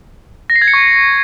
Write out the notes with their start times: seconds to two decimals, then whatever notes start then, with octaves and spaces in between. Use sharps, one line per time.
0.50 A#6
0.56 C7
0.62 G#6
0.68 C#7
0.74 C#6